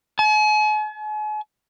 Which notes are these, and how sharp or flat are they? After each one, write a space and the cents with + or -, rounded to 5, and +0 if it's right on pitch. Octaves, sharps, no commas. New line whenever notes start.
G#5 +40